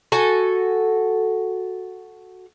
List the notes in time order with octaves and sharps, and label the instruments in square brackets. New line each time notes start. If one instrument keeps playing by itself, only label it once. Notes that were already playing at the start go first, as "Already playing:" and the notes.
[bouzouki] F#4 A4 G#5